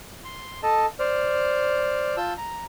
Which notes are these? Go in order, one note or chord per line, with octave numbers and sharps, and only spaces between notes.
C6
A4 D#5 A5
C5 D5 F6
F4 A5 E6 G6
A#5